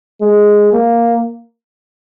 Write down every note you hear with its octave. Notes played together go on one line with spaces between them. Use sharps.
G#3
A#3